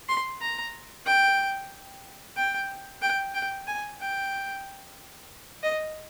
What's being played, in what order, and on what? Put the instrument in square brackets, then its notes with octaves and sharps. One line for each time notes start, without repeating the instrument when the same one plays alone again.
[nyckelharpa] C6
A#5
G5
G5
G5
G5
G#5
G5
D#5